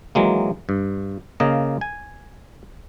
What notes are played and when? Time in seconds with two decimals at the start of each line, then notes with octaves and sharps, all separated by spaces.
0.15 D#3 E3 F#3 G#3 A#3
0.69 G2
1.40 C#3 A#3 D#5 F5
1.81 G#5